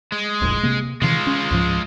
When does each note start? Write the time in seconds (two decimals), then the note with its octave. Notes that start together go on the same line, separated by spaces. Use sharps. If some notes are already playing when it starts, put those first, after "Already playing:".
0.12 G#3
0.42 D1 A#1 F2
0.63 C3 A#3
1.02 C3 D#3 E3 G#3 F4
1.27 C#4
1.51 C#2 G#2 F3